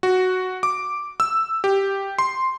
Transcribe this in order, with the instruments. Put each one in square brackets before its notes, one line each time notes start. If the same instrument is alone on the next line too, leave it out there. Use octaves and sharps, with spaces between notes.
[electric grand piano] F#4
D6
E6
G4
C6